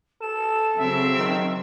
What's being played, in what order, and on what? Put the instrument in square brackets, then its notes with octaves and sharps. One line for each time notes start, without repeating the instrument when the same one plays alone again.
[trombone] A4 [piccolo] E7
[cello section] C#3 F#3 C4 [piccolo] E5
[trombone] D#3